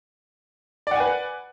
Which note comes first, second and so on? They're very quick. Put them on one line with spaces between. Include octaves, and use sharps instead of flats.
D5 F#5 G#5 B4